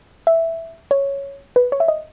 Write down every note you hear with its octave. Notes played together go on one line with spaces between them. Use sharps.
E5
C#5
B4
C#5
E5
D#5